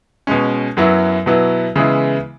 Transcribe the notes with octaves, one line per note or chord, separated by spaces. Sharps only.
B2 G#3 C#4
F#2 F#3 B3 E4
B2 F#3 B3 E4
C#3 E3 G#3 B3 E4